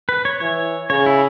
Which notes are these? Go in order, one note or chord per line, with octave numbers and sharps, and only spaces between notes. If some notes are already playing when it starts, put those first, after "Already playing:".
B4
C#5
E3 C#5
C#3 C#5
E4